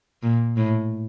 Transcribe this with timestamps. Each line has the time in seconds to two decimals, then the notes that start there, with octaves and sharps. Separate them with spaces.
0.23 A#2
0.57 A2